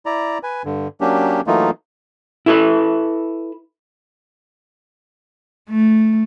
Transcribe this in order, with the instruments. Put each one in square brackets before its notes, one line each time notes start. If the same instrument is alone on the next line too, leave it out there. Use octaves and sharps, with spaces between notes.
[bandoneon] E4 D5 A#5
B4 G#5
G2 D3
F#3 A#3 C#4 D4 G4
E3 F#3 A3 A#3 D#4 F4
[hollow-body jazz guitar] E4 A4 B4
[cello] A3